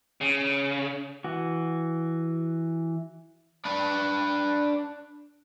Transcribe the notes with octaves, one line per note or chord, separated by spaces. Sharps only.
C#3
E3 F#4
D4 B4